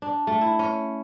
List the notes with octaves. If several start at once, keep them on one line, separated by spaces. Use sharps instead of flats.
D4
A3
E4
C#4